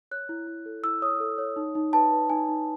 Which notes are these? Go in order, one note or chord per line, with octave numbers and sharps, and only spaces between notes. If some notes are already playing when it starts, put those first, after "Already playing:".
C#5 F#6
E4
E4
A4
E4 E6
C#5 D#6
A4
C#5
D#4
D#4
B4 A5
B4
D#4 G#5
D#4